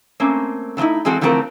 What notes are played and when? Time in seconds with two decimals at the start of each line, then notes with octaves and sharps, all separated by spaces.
0.20 A3 A#3 C4 C#4
0.77 D3 A3 C4 D#4 E4
1.05 E3 G#3 C4 F#4 A4
1.21 D3 E3 F3 A3 C4 A#4